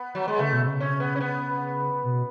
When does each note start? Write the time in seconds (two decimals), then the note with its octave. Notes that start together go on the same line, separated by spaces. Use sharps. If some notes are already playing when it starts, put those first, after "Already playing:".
Already playing: B3
0.15 F#3
0.28 G#3
0.39 C#3 A3
0.53 B2
0.67 C#3
0.80 C#4
1.00 B3
1.16 C#4
1.20 B3
2.04 B2